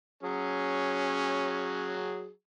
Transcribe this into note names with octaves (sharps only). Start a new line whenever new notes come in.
F#3 C#4 G#4